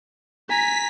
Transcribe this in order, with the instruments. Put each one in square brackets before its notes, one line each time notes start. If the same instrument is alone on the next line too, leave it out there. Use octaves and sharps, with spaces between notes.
[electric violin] G#5 A#5 [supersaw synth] B6